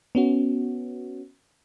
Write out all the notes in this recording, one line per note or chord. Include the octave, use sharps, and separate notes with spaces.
B3 C#4 F#4